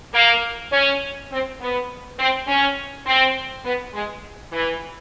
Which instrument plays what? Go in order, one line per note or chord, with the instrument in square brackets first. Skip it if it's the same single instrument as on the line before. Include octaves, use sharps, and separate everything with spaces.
[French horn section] A#3
C#4
C4
B3
C4
C#4
C4
B3
G#3
E3